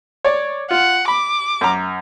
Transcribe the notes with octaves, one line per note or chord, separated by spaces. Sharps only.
C#5 D5
F4 F#5
B5 D6
F#2 A#5